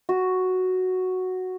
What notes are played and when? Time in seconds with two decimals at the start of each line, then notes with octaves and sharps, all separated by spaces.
0.09 F#4